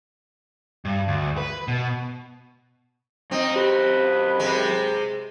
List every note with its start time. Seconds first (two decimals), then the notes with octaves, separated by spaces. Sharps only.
0.85 G2
1.08 D2
1.38 B4
1.68 B2
3.31 F#2 C4 D#4 D#5
3.56 G4 B4
4.40 C3 G#3